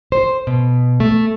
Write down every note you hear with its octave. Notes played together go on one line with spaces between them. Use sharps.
C5
B2
A3